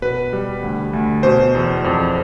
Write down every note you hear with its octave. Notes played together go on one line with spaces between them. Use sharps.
B2 B4
G3
D2
D2
B2 C5
E2
F2